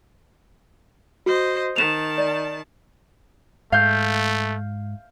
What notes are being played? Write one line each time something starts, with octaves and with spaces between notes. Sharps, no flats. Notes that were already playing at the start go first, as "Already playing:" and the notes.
F#4 C5 D#5
D#3 A5 E7 F7
D5
G#2 A3 F5 G6